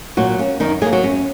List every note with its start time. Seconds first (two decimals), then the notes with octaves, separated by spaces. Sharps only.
0.17 A#2 F#3 F#4
0.39 A#3 C#4
0.60 F#2 D#3 D#4
0.81 F#3 G#3 A#3 G#4
0.92 F#3 F#4
1.03 F#2 C#4